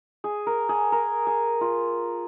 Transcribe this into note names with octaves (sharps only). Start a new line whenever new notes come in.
G#4
A#4
G#4
A#4
G#4
F4